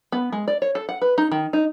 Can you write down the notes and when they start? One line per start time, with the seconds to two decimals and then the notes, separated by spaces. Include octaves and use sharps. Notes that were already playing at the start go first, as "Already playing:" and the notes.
0.12 B3
0.33 G#3
0.48 D5
0.62 C#5
0.75 A4
0.89 F#5
1.02 B4
1.18 D#4
1.32 D#3
1.53 D#4